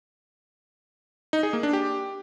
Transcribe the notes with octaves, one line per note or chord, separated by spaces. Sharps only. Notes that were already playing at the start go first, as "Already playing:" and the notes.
D#4
G#4
A#3
D4
G4